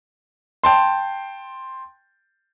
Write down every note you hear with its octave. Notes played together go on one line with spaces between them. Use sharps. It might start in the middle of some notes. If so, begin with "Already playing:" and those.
G5 A5 C6